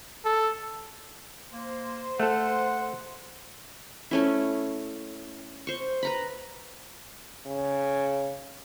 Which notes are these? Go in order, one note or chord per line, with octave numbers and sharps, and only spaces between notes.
A4
A#3 C5
A3 A4 F#5
A3 C#4 E4
C5 C#6
B4 A#5 B5
C#3